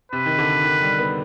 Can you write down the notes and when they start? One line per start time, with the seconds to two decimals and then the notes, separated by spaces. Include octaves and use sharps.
0.12 C3 B4
0.26 D#3
0.39 D3
0.64 D#3
0.82 G3
0.98 B3